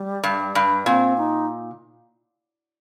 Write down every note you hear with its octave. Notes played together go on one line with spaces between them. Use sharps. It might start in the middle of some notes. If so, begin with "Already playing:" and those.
Already playing: G3
G2
G2
A#2 C4
D#4